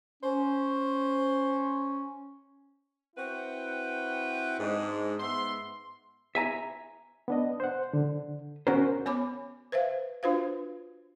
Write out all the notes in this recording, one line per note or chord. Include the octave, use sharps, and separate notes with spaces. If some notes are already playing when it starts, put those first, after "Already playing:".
C#4 C5
C4 E4 F#4 B4 F#5 G5
G#2 G#3 D4
G#2 B3 E5 C6
E5 G#5 A#5
B3 D4 D#5
C5 F#5
D3
D#2 C#4 F#4 A#4 C5
B3 C#5 G#5 B5 D6
B4 C5 E5 F5
D4 F4 F#4 B4 C5 F5